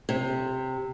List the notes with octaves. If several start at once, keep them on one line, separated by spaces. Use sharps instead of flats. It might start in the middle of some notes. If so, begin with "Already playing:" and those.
C3